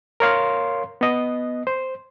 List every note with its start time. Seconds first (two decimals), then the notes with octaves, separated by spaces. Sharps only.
0.20 A#4 C#5 F5 C6
1.01 B3 D#5
1.67 C5